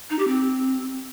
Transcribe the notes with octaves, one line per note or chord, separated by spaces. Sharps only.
D#4
G4
C4